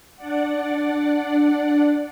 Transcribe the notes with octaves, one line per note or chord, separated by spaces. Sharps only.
D4 D5 F#5